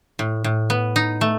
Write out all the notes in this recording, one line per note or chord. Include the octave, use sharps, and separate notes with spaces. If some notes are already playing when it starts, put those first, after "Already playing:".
A2
A2
B3
D#4
A3